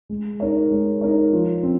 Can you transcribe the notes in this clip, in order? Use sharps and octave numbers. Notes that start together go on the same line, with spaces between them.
G#3
D#4 A#4 C#5
G#3
D#4 A#4 C#5
F3
C4